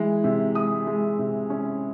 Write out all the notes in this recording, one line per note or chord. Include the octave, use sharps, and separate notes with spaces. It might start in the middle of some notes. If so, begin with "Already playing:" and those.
Already playing: E3 G#3
C3
G#3 D#6
G#3
C3
C#4